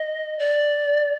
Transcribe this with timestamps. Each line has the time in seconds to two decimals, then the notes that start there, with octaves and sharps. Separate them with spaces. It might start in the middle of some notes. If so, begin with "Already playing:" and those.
Already playing: D#5
0.39 D5